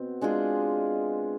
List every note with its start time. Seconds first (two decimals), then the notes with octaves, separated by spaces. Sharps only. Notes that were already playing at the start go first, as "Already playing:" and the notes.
Already playing: B2 C4
0.21 G#3 D4 F4 G#4